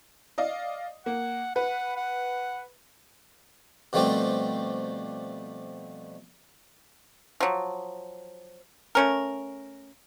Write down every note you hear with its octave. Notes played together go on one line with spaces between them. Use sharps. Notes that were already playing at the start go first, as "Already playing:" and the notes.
D5 D#5 F5
A#3 F#5
B4 F#5
F#5
B2 F3 G3 A3 C4 G4
F3 F#3
A3 C#4 A#4